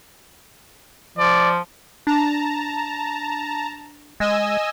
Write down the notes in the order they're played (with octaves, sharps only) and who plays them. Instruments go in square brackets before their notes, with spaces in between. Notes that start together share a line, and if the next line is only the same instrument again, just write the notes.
[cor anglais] F3 [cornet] D5
[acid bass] D4 [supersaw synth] A5 A#5
[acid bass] G#3 [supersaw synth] D#5 G#5 E6